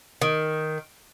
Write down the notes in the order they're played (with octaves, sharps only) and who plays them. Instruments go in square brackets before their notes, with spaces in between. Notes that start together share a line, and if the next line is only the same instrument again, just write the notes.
[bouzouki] D#3